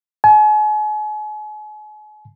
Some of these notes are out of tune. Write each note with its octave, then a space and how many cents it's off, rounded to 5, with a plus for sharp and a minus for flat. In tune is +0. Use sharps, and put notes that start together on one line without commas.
G#5 +40